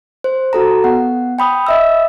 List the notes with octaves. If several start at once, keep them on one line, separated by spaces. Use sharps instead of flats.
C5
F#4 A4 A#5
B3 F#5
G5 B5 D#6
D#5 E5 E6